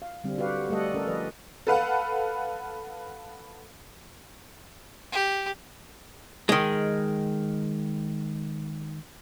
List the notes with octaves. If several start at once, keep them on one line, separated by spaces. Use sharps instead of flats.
F5
D3 G3 C4
F#4 G4 B4 F5 F#5
G3 A3 A4 D#5 F#5
C#4 A4 A#4
F3 B4 D5 D#5
A4 B4 F5 F#5
G4
D#3 G#3